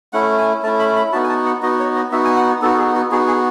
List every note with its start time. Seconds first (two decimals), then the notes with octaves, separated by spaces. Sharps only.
0.13 A3 C#4 E4 F#5
0.38 G#5
0.62 A3 C#4 E4 A5
0.79 B5
0.96 B5
1.12 B3 D#4 F#4 A5
1.24 G#5
1.29 A5
1.45 F#5
1.63 B3 D#4 F#4 D#5
1.79 C#5
1.96 D#5
2.12 B3 D#4 F#4 E5
2.25 G#5
2.37 F#5
2.62 B3 D#4 F#4 A4
2.74 A4
2.78 G#4
2.95 F#4
3.11 B3 D#4 F#4 G#4
3.28 G#4